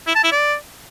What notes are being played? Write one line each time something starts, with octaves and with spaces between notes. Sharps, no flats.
E4
A5
E4
D5